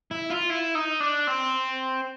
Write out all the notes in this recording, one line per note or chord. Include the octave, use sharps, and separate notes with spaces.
E4
F4
E4
D#4
D4
C4